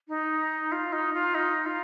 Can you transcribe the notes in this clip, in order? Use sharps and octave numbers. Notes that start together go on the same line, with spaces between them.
D#4
F4
D#4
F4
D#4
F4